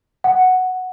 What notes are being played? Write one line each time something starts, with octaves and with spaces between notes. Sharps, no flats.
F#5